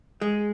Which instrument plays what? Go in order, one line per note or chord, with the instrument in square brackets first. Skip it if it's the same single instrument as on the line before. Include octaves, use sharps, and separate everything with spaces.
[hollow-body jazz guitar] G#3